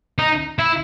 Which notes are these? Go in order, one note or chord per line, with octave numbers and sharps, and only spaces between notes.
D#4
E4